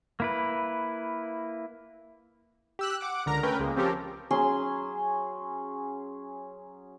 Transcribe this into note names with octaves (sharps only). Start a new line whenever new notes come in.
A#3 E4 B4
G4 E6 F#6
F#5 D6
C#2 D3 A#4 A#5
A3 C#4 A#4 B4 G5
C#2 G#3 A#3
F3 C4 C#4 G4 A4 A#4
F#3 C#4 G#4 C6